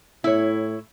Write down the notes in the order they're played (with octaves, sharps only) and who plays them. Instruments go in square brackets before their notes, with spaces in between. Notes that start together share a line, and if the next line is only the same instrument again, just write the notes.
[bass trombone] A2 [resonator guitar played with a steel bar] E4 C#5